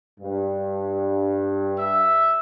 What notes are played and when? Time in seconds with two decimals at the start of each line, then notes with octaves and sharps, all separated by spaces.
0.20 G2
1.79 E5